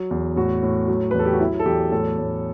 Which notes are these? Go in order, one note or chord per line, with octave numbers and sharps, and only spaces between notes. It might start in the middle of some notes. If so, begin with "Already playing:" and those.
Already playing: F#3
E2
A2 F#4
A2
F#3
B4
E2
A4
G4
F#4
F#3 E4
A4
E2 G4
A2 A4
A2